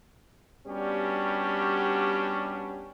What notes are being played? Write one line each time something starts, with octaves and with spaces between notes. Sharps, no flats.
G3 B3 C#4 D4 F#4 G4